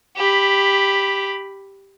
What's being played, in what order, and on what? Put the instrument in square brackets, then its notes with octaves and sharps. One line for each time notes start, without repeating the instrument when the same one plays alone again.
[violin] G4 B5